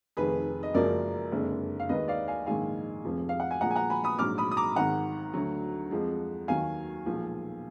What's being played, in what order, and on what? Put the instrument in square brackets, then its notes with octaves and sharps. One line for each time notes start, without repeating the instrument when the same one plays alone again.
[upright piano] F1 F2 D#3 G#4 B4
D#5
F#1 F#2 F3 G#3 A#4 D5
F#1 F2 D3 G#3
F5
D#2 D#3 G#3 B4 D#5
D5 F5
F5 G#5
A#1 G#2 D#3 G#3 F5 G#5
F1 F2 F3 G#3
F5
F#5
G#5
A#1 A#2 F3 G#3 F#5 A#5
G#5
F#5 A#5
G#5 B5
B5 D#6
A#1 G#2 F#3 D6 F6
B5 D#6
D#6
A#5 D6
G#1 G#2 D#3 F#5 A#5
D2 D3 F#3
F2 F3 G#3
D#2 D#3 F#3 F5 G#5
B1 A#2 F3 G#3